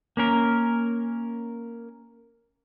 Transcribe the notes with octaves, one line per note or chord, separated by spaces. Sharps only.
A#3 C#4 A#4